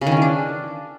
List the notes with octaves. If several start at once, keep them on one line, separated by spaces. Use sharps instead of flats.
C#3
D#3
C#4
E3
D4